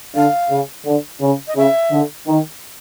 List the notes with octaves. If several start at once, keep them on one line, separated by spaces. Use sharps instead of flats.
D3 F5
C#3
D3
C#3
D#5
C#3 E5
D3
D#3